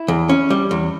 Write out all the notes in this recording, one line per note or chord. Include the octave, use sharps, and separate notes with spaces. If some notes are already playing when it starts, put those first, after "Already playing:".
Already playing: E4
E2
C#4
G3
E2